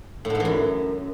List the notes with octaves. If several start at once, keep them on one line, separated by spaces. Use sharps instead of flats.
A2
D3
G#2
E3
F#2